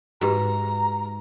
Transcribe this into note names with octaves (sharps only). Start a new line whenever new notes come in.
G#2 F#4 G4 B4 A#5